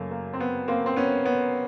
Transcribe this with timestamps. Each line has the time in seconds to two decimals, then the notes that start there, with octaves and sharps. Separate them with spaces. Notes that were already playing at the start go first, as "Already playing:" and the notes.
Already playing: F#2 C#3 F#3 A3 A#3
0.11 A#3
0.33 C4
0.40 B3
0.68 A#3 C4
0.86 C4
0.96 B3 C#4
1.25 B3 C#4